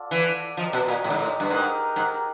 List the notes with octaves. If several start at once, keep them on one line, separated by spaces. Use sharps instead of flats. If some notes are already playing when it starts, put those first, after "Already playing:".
Already playing: F4 A4 D5 F#5
E3
F3 D4 G4 A#4 D#5
B2
A#2
A2
G#2
A2
G2
G#2 D#4 G4 A#4
G#2